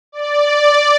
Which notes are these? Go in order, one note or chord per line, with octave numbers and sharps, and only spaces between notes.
D5